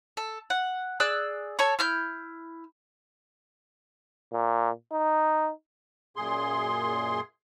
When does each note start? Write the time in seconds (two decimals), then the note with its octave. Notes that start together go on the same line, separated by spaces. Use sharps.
0.17 A4
0.50 F#5
1.00 G#4 D5 E6 F#6
1.59 A4 C#5 C#6
1.79 E4 F6 G6
4.32 A#2
4.92 D#4
6.16 F#2 A#2 G#4 C6